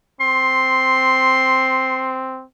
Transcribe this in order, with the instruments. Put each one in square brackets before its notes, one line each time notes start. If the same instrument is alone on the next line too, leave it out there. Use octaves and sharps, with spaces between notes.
[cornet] C4 [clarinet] C6